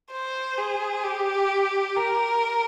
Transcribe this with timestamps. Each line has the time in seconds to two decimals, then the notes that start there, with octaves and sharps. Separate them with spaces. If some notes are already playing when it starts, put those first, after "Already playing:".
0.12 C5
0.58 G#4
1.04 G4
1.97 A#4